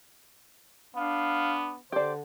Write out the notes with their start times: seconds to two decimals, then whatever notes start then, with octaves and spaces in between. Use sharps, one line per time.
0.95 B3 D4 F5
1.92 D3 G4 C5 D5